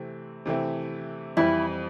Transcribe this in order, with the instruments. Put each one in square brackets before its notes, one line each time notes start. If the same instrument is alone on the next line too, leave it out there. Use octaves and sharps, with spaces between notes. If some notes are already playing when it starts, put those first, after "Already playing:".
Already playing: [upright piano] C3 E3 A3 C4
C3 E3 A3 C4 E4
[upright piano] F2 E3 G3 [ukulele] E4